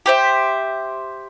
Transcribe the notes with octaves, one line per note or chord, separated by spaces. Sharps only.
G4 C5 E5